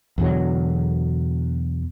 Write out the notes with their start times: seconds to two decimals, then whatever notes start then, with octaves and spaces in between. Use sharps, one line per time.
0.18 E2 B2 D3 F#3